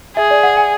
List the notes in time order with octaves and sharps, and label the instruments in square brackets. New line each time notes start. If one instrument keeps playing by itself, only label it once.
[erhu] G#4 [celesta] E5
[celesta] D5
F#5
G#5